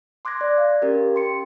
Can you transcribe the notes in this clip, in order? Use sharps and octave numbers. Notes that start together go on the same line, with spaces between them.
C6 D6 F#6 G#6 A#6
D5
F5
C#4 G4 A#4
G5 C6 C#7